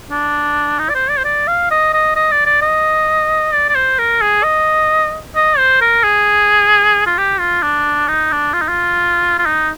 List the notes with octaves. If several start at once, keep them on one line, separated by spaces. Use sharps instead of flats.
D4
D#4
D5
C5
D5
C5
D5
F5
D#5
D#5
D#5
D5
D5
D#5
D5
D5
C5
A#4
G#4
D#5
D#5
C5
A#4
G#4
F4
G4
F4
D4
D#4
D4
F4
D#4
F4
F4
D#4